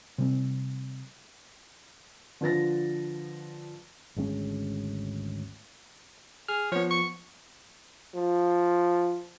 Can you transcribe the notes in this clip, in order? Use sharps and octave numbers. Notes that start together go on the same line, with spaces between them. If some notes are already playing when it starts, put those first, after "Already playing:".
C3 G3 C4
D3 F3 B4 A6 A#6
G#1 D2 G#3 C#4
G#4 F6
F3 B3 C#5
C#6
F3